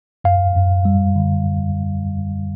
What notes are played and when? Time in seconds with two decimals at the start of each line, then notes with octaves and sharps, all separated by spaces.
0.24 F#2 F5
0.55 F#2
0.85 G3
1.16 D3